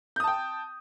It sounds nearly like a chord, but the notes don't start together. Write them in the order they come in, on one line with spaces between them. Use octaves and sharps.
G6 D#6 A5 G5